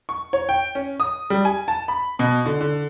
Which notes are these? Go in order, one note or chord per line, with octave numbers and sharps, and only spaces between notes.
C#6
C#5
G5
C#4
D#6
G3
G#5
A5
B5
B2
D3
D3